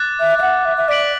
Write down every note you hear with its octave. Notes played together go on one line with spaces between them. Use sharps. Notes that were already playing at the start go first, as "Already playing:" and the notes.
Already playing: D6 F#6 A6
E5
E5
F#5
E5
E5
D5 F#6 B6 D7 F#7